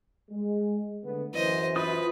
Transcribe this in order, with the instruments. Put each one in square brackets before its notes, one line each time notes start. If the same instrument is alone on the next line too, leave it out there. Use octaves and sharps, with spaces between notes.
[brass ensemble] G#3
D3 A3 B3
[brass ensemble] F#2 E3 [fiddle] C5 D#5
[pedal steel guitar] F4 C5 D#6 [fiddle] B4